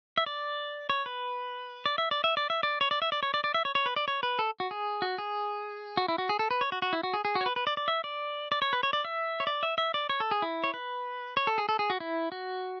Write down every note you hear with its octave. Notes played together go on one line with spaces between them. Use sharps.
E5
D5
C#5
B4
D5
E5
D5
E5
D5
E5
D5
C#5
D5
E5
D5
C#5
D5
D5
E5
C#5
C#5
B4
D5
C#5
B4
A4
F#4
G#4
F#4
G#4
F#4
E4
F#4
G#4
A4
B4
C#5
F#4
F#4
E4
F#4
G#4
G#4
F#4
C#5
B4
B4
D5
D5
E5
D5
D5
C#5
B4
C#5
D5
E5
C#5
D5
E5
E5
D5
C#5
A4
G#4
E4
C#5
B4
C#5
A4
G#4
A4
G#4
F#4
E4
F#4